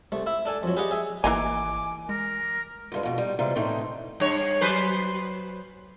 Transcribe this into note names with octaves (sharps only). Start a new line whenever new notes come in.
C2 A3
E4 E5
D4 A4 G#5 A5
F2 F#3
G4 G#4 B4 D5 D#5 F#5
G#4 E5 G#5
G#1 E3 A#3 D#4 G#5 D6
G#3 A#4
D2 G2 G#3
F2 B2
G3 D#4
C3 E3 G3 G#3 F4
A2 E3 C4 D#4
G2 C#5
F#3 B4 C5